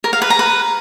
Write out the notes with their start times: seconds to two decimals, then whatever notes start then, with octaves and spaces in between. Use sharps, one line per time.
0.04 A#4
0.13 F5
0.22 B4
0.30 A#5
0.39 B4